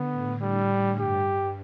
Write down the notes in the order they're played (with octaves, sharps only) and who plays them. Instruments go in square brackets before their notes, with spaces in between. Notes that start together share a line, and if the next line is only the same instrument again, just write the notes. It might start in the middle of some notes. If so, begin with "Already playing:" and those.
Already playing: [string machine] D3 [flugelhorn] B3
[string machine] A2
[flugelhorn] G3
[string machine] G2 [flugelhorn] G4